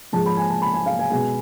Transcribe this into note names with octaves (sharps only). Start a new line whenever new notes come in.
G#2 F3 G#3 A5
B5
G#5
A5
B5
G#5
F5
G#5
B2 G#3 B3 G#5